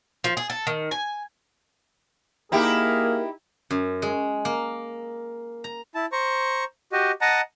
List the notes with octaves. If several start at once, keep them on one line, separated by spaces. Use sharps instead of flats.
F3
G#4
A4
D#3
G#5
A#3 D#4 E4 G4 G#4 A#4
F#2
G#3
A#3
A#5
E4 A5
C5 A#5 C#6
F#4 G4 D#5
D#5 F#5 A5 A#5